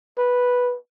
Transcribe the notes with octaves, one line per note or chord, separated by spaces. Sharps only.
B4